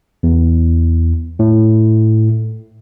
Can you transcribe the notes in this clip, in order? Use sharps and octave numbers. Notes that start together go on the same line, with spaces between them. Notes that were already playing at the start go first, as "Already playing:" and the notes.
E2
A2